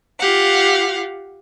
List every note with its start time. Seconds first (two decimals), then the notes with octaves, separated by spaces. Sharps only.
0.20 F4 G4 F5 F#5